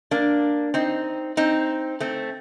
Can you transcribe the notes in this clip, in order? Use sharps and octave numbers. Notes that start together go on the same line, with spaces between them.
A#3 D4
C4 D#4
C4 D#4
A3 C4